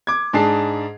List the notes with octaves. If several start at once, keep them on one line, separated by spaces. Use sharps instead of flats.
D6 G#6
G#2 D4 G#4 A5 C7